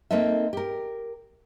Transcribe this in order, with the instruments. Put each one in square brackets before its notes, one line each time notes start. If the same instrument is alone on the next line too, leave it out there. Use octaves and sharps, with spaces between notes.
[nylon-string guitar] A#3 C4 D#4 A4 E5
G4 A#4